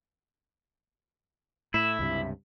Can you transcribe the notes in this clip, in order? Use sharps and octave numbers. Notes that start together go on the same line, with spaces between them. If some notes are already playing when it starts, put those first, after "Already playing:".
A2 E4 E7
C#2 G2 C3 E5